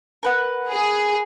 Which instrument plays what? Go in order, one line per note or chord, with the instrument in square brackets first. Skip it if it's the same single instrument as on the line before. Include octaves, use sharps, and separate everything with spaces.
[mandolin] A#4 B4 F#5
[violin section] G#4